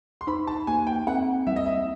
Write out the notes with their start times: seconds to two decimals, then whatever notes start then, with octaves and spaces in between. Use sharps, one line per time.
0.21 C6
0.27 D#4 B5
0.47 A5
0.67 A#3 G#5
0.87 G5
1.07 C4 F#5
1.47 G3 E5
1.56 D#5
1.66 E5